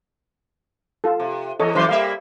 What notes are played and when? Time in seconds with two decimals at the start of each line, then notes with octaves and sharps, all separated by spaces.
1.04 F4 A4
1.20 C3
1.60 E2 A4 C#5 D#5
1.75 F#2 E3 C5 C6
1.89 G3 A#3 E5 F5